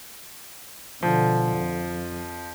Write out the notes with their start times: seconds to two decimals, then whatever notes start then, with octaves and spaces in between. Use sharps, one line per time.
1.03 B2 D3 F3
1.56 F2